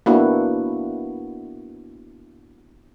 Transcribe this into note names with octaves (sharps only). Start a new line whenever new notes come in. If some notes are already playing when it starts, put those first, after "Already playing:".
A#3 B3 D4 E4 F#4